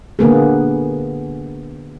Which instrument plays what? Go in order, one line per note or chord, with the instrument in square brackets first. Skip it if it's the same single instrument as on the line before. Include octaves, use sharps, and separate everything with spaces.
[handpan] D3 A#3 B3 G#4